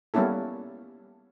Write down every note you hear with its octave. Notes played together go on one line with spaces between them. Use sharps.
G3 A#3 B3 C#4 E4 A4